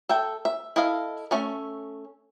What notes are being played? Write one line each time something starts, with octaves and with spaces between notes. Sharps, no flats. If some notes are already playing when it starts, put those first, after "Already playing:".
A4 E5 G5
E5
E4 A4 D#5 F5
A3 C#4 E5